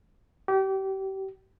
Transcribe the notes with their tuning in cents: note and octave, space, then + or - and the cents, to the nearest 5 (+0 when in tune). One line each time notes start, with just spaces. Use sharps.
G4 -30